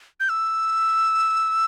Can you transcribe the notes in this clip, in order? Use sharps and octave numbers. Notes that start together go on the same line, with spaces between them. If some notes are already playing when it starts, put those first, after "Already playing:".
G6
E6